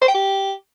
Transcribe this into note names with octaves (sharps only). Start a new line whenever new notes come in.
C5
G5
G4